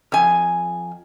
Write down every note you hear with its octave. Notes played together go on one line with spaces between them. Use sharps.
F2 G#5